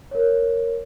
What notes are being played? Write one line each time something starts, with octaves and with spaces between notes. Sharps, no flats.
A#4 C#5